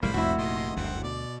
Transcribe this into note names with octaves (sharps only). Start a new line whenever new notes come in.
F1 A2 G3 G#3 A#3 D4 C5 B5
F1 C2 F2 A#2 A3 E4 F#4
A#2 D#3 D#5 C6
F#1 D2 G2 C4 F#5
B2 D5 D6